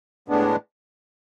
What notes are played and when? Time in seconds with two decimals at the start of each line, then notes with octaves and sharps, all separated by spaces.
0.28 A2 G#3 B3 D4